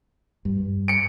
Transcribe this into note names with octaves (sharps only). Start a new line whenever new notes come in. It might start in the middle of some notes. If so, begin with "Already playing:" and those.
G2
C#7 D7